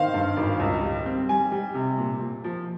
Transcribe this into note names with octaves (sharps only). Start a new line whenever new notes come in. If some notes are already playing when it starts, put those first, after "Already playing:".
Already playing: D#3 C5 F5
G2
G#1
C#2
G3
C4
G3 G#5
G3
C3
A#2
A#2
F3